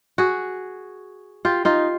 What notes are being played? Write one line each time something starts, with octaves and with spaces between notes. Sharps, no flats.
F#4 G#4
F4 G4
D#4 F4